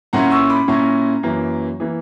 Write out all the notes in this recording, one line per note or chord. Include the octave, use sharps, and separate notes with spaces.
A#2 A#3 C#4 E4 F#5 A#5
C#6 E6
B5 D6
A#2 A#3 C#4 E4 A#5 C#6
F#2 E3 A#3
E3 A#3